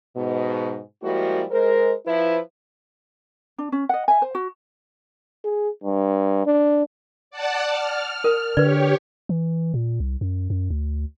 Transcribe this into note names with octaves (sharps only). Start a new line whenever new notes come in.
G#2 B2
F3 G3 G#3 A#3 E4 F#4
G#3 A#4 C5
F3 E4 B4
D4
C#4
D#5 F#5
E5 G#5
C5
F#4
G#4
G2
D4
D5 F#5 A5
F6
A#4
D3 G4 B4 C#5 D5
E3
A#2
C2
F#2
F#2
D2